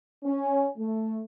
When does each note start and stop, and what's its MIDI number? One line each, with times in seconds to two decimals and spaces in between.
0.24 0.67 61
0.78 1.22 57